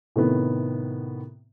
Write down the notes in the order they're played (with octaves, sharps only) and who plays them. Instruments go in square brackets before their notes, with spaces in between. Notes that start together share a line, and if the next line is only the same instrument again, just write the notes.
[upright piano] A2 C3 D#3 B3